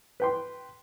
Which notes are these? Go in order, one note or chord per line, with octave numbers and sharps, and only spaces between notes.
B4 G5 C6